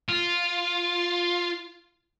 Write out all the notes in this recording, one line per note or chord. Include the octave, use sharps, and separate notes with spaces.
F4